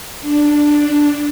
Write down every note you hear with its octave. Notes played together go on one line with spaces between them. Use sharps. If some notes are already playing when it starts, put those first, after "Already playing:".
D4